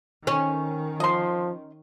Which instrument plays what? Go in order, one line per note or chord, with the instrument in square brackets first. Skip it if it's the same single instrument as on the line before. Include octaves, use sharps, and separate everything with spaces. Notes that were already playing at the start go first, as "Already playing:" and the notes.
[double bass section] D#3 [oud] C#4
[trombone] F3 [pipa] D#5 C6